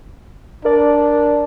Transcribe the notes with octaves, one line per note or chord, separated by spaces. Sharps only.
D4 A#4 D5